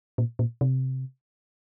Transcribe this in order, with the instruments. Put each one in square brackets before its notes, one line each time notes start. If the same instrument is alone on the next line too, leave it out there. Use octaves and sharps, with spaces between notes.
[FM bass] A#2
A#2
C3